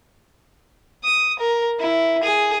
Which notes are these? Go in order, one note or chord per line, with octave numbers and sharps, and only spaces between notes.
D#6
A#4
E4
G#4